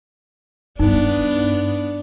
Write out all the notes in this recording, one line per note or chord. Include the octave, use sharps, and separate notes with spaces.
G2 B3 D4 D#4